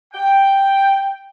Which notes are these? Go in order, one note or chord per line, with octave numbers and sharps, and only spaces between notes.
G5